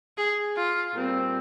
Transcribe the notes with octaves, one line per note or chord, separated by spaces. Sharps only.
G#4
F4
A#2 G3 C4